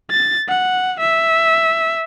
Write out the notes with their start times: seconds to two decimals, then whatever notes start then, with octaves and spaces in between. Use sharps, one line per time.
0.11 A6
0.48 F#5
1.00 E5